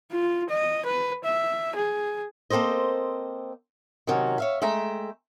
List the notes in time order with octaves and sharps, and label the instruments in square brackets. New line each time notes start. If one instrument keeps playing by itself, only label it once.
[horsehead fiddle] F4
D#5
B4
E5
G#4
[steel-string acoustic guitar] A#3 C4 A4 C5 D#5
C3 D#3 F#3 C#4
C#5 E5 F5
G#3 A3 E5 G5 A#5